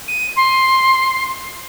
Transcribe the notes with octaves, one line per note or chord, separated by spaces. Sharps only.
D#7
C6